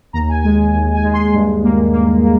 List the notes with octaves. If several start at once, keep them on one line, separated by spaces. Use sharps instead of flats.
D#2 A#5
G#5
G#3 G#5
D#2
G#5
G#3
C6
G2
A#3
A#3
A#3